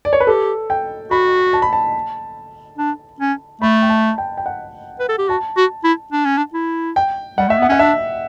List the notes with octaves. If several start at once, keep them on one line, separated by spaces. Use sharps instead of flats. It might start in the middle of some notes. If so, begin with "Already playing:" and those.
D5
C#5
B4
G4 A4
G5
F#4 B5
A5
B5
A5
D4
C#4
A3 B5
G5
A5
G5
G5
F#5
B4
A4
G4
F#4 A5
F#4
E4
D4
C#4
D4
E4
G5
G3 F#5
A3 E5
B3 F#5
C#4 F#5
D4 E5